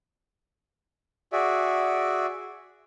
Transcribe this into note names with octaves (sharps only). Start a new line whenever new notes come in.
F#4 G#4 D5 E5